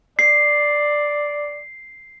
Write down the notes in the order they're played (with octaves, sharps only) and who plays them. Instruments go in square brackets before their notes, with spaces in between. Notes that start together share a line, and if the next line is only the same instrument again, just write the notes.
[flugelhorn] D5 [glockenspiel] C7